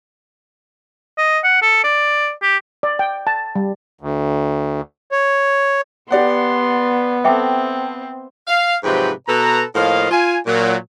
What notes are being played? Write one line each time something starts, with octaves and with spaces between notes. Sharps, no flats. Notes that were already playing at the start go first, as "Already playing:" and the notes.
D#5
F#5
A4
D5
G4
D5
G5
A5
G3
D2
C#5
B3 G4 D5 F#5 C6
C4 A4 E5 G5 D6
F5
G#2 C3 F3 F#3 B4 G5
B2 A4 B4 A#5
A2 F3 A#3 D#5 F5
F4 G#5
A#2 F#3